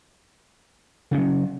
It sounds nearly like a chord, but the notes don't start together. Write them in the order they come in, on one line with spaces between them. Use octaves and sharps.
C#3 C#4 F#3